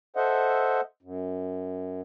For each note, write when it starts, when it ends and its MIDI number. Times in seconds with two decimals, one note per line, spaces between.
0.16 0.81 69
0.16 0.81 72
0.16 0.81 75
0.16 0.81 76
0.16 0.81 78
1.02 2.01 42